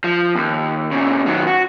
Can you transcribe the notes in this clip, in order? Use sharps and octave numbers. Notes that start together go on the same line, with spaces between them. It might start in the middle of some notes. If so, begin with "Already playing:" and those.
F3
D#2
A#2 C#3
D#3 F#3
F#4